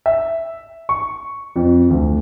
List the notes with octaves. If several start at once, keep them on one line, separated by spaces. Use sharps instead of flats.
E5
C#6
F2
D2